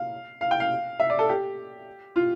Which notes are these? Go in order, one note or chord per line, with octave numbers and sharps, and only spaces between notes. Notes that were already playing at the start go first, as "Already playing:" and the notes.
Already playing: F5
F5
G5
F5
E5
D5
A4
G4
F4